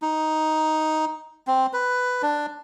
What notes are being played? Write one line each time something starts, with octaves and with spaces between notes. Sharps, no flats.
D#4
C4
B4
D4